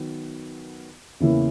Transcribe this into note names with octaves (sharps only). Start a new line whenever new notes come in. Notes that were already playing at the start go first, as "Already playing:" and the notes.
Already playing: D#3 F#3 B3 F#4
E2 C#3 E3 A#3 E4